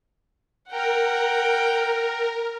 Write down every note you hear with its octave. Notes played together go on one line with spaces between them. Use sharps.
A#4 F#5 G5